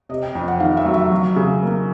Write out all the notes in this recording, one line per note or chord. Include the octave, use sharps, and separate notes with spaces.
C3 D#5
G5
F2 G5
F#5
D#3 F5
E5
F#3
E5
F#3
C#3
A#3